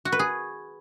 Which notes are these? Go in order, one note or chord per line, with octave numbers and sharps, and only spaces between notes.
F#4
B4
G#4